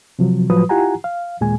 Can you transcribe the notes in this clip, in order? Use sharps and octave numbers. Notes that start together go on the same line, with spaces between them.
C3 F3 F#3
A2 F3 F#3 B4 D#6
E4 F4 G4 F#5 G#5 A#5
F5
D#2 A#2 G#3 G#5